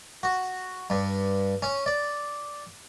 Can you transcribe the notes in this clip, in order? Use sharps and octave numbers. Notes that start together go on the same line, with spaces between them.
F#4
G2
C#4
D5